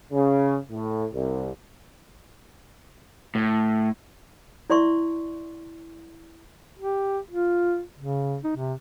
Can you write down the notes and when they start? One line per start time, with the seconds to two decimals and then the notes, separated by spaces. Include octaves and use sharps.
0.12 C#3
0.71 A2
1.14 C2
3.35 A2
4.70 E4 D5 E5 C6 C#6
6.79 G4
7.31 F4
7.98 C#3
8.44 D#4
8.56 C3